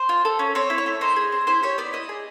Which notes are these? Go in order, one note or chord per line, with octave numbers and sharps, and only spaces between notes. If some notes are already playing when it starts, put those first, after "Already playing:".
Already playing: C5
F4
A4
C#4
C4 C#5
E4
C#5
A3
D#4 C5
G#4
C4
E4 C5
G4 C#5
B3 D5
E4 D#5
G#4